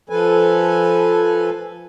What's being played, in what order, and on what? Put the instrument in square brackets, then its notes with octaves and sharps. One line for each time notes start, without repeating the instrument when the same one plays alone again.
[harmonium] F3 A4 B4 G#5